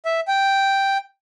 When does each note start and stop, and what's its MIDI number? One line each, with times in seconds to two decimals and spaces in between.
0.05 0.20 76
0.28 0.98 79